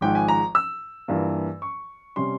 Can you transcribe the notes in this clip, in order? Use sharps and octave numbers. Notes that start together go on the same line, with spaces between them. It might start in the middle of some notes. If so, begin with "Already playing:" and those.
G#1 G#2 F3 G#3 G5
G#5
A#5
E6
G2 E3 A#3 F4
C#6
C3 G3 C#4 C6